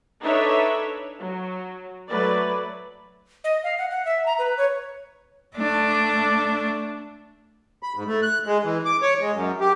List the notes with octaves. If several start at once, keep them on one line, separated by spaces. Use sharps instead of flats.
D4 D#4 A4 B4 C#5 E5
F#3
F#3 A3 B4 D5
D#5
F5
F#5
F#5
E5
A#5
B4
C#5
A3 D4
B5
G#2
A3
F#6
G#3
E3
D6
C#5
G#3
F#2
G4